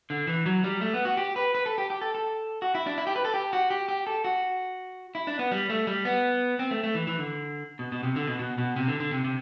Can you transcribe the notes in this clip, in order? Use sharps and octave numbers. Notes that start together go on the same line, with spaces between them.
D3
E3
F#3
G3
A3
B3
F#4
G4
B4
B4
A4
G4
G4
A4
A4
F#4
E4
D4
E4
G4
B4
A4
G4
F#4
G4
G4
A4
F#4
E4
D4
B3
G3
A3
G3
B3
C4
A3
A3
E3
E3
D3
B2
B2
C3
D3
B2
B2
B2
C3
D3
D3
C3
C3